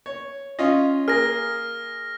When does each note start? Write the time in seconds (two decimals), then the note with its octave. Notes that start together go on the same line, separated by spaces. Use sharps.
0.06 C#5
0.59 C#4 F4 D#5
1.08 A#3 G#4 A#4 F6 A#6